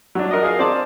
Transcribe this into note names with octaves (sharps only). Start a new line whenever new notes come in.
F#3 D4
A#4 D#5
G#4 A#4 F5
C4 D5 A5